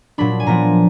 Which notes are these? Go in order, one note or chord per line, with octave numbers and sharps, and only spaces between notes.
A#2 F#3 D4 B5
G#5
A#2 F3 B3 D4 A#5